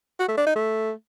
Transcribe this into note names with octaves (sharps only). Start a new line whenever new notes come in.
F#4
A3
D4
D#4
A3